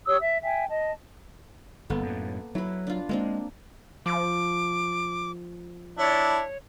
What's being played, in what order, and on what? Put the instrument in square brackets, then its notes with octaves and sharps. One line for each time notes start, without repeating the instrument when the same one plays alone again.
[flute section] G4 C#5 D#6 E6
E5
E5 G5 G#5
D#5 A5
[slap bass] G1 [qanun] A#3 B3 A4
[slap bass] F#2 A2
[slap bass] F#3 [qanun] E4 B4
[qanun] D4 F4
[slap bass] G#3 [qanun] A#3 C4 D4
[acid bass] F3 [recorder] D6
[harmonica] D4 E4 [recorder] C#5